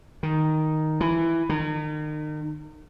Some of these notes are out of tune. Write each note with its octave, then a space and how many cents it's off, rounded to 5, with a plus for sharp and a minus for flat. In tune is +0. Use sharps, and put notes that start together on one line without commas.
D#3 +0
E3 +10
D#3 -35